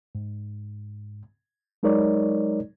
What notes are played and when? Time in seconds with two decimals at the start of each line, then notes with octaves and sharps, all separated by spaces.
0.15 G#2
1.83 F#3 G#3 D#4 A#4 C#5 D5